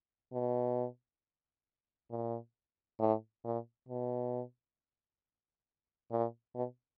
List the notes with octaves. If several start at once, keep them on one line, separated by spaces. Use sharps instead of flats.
B2
A#2
A2
A#2
B2
A#2
B2